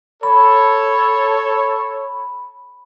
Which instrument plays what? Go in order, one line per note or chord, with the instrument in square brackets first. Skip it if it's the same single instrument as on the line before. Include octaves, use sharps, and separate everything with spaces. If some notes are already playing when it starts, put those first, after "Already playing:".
[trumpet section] A4 C#5 [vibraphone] B5